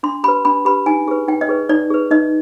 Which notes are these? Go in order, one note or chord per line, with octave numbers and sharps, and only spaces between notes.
D4 C6
G4 B4 B5
D4 B5
G4 B4 B5
D#4 G#5
G#4 B4
D#4 G5
D#5
G#4 B4
D#4 D5
G#4 B4
D#4 D#5